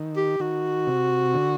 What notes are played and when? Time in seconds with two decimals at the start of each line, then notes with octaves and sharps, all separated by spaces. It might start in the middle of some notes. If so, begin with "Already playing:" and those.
Already playing: D#3
0.16 G4
0.40 D#3 F#4
0.87 C3
1.34 D3